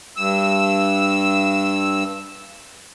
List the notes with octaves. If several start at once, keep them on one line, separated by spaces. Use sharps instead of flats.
G2 E6